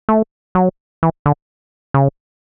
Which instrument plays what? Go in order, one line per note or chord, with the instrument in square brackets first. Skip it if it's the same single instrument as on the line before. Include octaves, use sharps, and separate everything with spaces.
[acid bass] A3
F#3
E3
D3
C#3